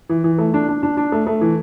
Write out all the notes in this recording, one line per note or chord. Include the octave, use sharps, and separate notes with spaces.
E3
E3
A3
D4
D4
D4
D4
A3
A3
E3